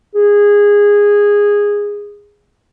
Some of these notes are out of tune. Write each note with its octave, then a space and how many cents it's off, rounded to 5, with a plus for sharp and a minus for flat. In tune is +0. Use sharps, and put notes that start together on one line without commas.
G#4 -15